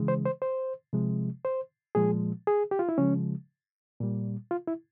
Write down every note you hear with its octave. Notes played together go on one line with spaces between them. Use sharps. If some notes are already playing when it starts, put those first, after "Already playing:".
Already playing: C#3 E3 G#3
C5
C5
C5
C3 F3 G#3
C5
A#2 F3 G#3 G#4
G#4
G4
F4
E4
C#3 F3 G#3 C#4
A#2 G3
F4
E4